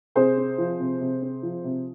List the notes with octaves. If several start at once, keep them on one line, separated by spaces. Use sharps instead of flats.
C3 G#4 C5
C4
F3
C3
C3
C4
F3
C3